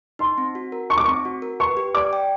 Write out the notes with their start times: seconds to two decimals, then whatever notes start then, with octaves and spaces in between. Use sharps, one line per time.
0.19 D#4 C6
0.38 C4
0.55 F#4
0.72 A#4
0.90 D#4 C#6
0.98 D6
1.05 C4 C#6
1.25 F#4
1.42 A#4
1.60 B4 C#6
1.77 G4
1.95 D5 D6
2.13 G5